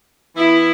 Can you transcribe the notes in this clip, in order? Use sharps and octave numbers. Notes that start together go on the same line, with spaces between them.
E3 B3 E4